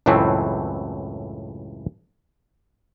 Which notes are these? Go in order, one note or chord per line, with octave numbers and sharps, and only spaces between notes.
C#2 F#2 A2 E3 A3 C4